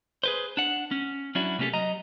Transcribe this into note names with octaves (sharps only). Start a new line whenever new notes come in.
G#4 B4 C5
D4 F#5
C#4
F#3 C#4 D4 E4 F#4
C3 A3 A#3 C#4 G4 A4
F#3 D#5 A#5